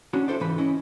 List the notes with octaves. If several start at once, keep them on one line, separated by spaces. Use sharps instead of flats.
C#4 D4 F#4
E4 F4 A4 C5 D5
C#2 G#2 E3 B4 B5
C#4 E4 D#5